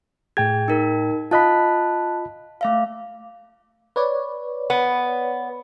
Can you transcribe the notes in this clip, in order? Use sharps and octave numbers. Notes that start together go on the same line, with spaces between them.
A2 G#4 G5 G#6
D#4 A#4
F4 D#5 A5 B5 F#6
A3 E5 F5
B4 C#5 D5
B3